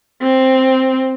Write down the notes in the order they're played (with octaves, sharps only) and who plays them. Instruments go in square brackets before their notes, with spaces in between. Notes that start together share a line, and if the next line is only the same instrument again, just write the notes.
[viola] C4